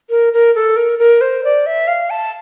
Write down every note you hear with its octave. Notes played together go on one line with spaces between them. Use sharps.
A#4
A#4
A4
A#4
A#4
C5
D5
E5
F5
A5